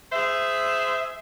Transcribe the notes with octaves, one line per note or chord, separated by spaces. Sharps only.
G#4 C5 E5